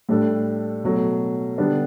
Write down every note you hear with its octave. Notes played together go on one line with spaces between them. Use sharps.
A2 G3 D4 A4
B2 F#3 A3
D3 G3 B3 D4